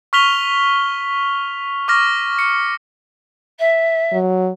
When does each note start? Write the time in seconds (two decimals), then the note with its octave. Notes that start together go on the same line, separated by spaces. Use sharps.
0.13 C#6 F6 B6 F7 G7
1.88 C#6 D6 F6 A#6
2.39 C#7
3.59 E5
4.13 F#3